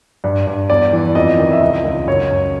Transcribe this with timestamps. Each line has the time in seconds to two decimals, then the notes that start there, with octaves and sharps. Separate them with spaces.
0.24 G2
0.47 G2
0.70 E2 D5
0.93 E3
1.15 F2 D#5
1.39 D#3
1.52 E5
1.61 C#2 D#5
1.84 C#2
2.07 F#2 C#5
2.31 F#2